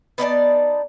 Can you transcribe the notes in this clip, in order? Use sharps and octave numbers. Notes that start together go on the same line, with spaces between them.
B3 D#4 D5 A5